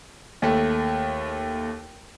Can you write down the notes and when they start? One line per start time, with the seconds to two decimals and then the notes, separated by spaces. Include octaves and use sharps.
0.42 D#2 A3